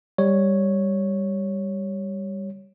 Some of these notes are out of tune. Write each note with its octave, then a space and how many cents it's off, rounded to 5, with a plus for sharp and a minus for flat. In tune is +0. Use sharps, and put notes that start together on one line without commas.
G3 +10 C#5 +0